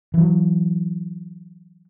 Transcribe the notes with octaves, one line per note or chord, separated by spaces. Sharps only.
E3 F#3